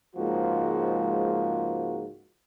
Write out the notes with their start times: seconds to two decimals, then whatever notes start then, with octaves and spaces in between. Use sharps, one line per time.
0.16 C#2 G#2 F3 A#3 F#4